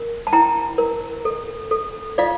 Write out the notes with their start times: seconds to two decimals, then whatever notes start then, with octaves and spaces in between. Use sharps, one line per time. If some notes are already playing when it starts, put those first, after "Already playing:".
Already playing: A#4
0.27 A5
0.33 E4 G5 A#5
0.78 A#4
1.25 A4
1.71 A4
2.18 F4 D5 F5